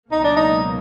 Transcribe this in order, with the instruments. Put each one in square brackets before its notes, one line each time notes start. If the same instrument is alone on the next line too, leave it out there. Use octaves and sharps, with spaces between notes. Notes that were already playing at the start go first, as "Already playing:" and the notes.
[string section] C#2 B2 F#3 A#3 [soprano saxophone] D#4
[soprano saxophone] D4
D#4